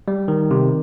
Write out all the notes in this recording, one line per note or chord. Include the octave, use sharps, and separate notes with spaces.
G3
D#3
C3